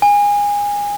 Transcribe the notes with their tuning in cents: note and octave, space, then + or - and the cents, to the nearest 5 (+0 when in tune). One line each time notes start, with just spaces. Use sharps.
G#5 -25